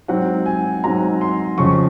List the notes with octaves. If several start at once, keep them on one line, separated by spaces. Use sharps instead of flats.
G#2 F#3 C4 F#5
G#5
G#2 F#3 C4 A#5
C6
F2 C#3 F3 C#6